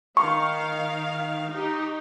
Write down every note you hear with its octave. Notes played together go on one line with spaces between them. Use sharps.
D#3 F5 C#6
D#4 G4